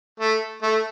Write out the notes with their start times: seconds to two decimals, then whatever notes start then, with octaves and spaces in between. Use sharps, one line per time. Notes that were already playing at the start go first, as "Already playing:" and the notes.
0.20 A3
0.62 A3